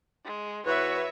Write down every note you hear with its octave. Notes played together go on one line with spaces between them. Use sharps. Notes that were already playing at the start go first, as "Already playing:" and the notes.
G#3
E2 E3 F#4 B4 C#5 E5